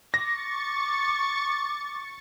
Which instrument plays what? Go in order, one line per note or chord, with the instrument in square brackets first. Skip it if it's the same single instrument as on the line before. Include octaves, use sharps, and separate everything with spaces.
[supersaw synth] C#6 A6 C#7 [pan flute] D6 [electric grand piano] A#6